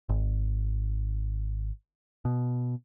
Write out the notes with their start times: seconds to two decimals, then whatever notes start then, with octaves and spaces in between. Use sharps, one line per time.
0.09 G#1
2.25 B2